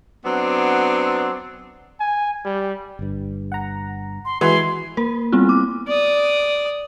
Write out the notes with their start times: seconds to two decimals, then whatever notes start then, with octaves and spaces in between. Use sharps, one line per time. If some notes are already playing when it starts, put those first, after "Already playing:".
0.25 F#3 B3 C4 D4
2.00 G#5
2.45 G3
2.99 G1 G2
3.52 F#5 A#5
4.25 C6
4.41 E3 G#3 F#4 G#4 C6
4.97 A#3 A#4
5.32 G3 B3 C4 E4 F4
5.49 D6
5.87 D5 D#6